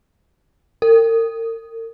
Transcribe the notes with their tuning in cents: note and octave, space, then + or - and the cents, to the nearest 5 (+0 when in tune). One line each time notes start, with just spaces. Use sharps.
A#4 -40